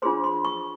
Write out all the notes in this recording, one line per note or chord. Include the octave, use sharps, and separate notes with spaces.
D4 F4 G#4 C5 C6
C6
C#6